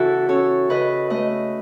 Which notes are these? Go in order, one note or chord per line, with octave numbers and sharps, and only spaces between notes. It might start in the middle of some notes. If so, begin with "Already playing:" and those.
Already playing: C#3 E3 E4 F#4 A4
C#4 A4 C#5
C#3 B4 D#5
A3 B4 D#5